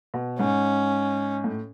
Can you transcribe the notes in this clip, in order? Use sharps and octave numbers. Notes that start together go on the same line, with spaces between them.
B2
G#2 C#4
A2